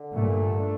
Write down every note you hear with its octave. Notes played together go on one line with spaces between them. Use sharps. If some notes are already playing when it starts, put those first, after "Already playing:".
Already playing: D3
G2 A#2 A3
D4